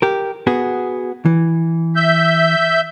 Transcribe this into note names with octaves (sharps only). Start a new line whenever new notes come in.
G4 A#4
B3 F#4 G#4
E3
E5 G6